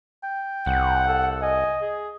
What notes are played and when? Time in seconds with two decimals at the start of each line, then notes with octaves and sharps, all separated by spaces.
0.23 G5
0.66 C2 F#5
1.07 A4
1.42 D#5 G#5
1.81 G#4